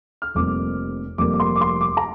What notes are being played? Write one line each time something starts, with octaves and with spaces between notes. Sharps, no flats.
F6
F1 F2 C3 G3 A#3 D6
F1 F2 C3 G3 A#3 D6
D6
C6
D6
C6
D6
A#5